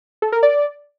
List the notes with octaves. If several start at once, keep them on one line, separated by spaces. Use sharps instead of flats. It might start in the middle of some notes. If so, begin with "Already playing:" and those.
A4
A#4
D5